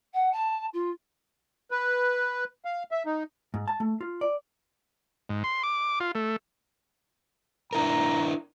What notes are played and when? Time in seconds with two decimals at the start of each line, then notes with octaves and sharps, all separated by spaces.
0.13 F#5
0.32 A5
0.73 F4
1.71 B4
2.65 F5
2.91 E5
3.06 D#4
3.54 G#2
3.68 A5
3.80 A3
4.01 F4
4.21 D5
5.29 G#2
5.44 C6
5.63 D6
6.00 F4
6.15 A3
7.73 D4 E4 A#4 A#5